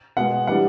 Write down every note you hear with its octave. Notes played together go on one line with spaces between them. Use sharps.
B2 G#3 B3 F#5
E3 G3 B3 D4 F#5